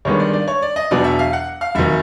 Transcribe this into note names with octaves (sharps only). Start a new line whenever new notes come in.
G2 D#3 G#3 B3 D4 C#5
D5
D5
C#5
D5
D#5
E2 B2 F#3 B3 D4 D5
E5
F5
F#5
F5
F1 D#3 F#3 E5